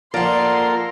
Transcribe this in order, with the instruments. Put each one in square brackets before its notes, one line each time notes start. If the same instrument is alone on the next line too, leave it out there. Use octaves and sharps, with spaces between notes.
[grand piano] F3 D7 [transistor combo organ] A#3 A4 A#4 [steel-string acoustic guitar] D5 F#5 [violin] C6